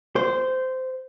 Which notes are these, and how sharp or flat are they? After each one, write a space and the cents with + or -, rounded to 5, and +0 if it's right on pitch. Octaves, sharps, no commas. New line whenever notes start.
C5 -15